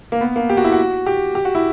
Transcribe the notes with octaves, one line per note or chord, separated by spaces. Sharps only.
A#3
B3
A#3
G4
F#4
E4
F#4
G4
G4
F#4
E4